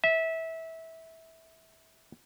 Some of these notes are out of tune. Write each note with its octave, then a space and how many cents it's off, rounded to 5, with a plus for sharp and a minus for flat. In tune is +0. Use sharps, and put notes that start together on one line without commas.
E5 -20